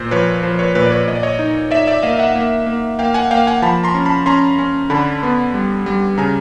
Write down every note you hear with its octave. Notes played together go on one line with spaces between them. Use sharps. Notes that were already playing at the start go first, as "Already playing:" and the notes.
Already playing: A#2 C5
F3 B4 C#5
F3 C5
B4 C#5
A#2 B4 C#5
D5
B4 C#5
A#2 D#5
D5
C#5 D#5
D#4
D#4 D5 E5
D5 E5
A#3 D#5 F5
E5 F#5
A#3
A#3
A#3 F5 G5
F#5 G#5
A#3 F5 G5
F#5 G#5
F3 A5 B5
A#5 C6
C#4
A5 B5
C#4 A#5 C6
C#4
D3 A5 B5
B3
G3
G3
C#3 G#5 A#5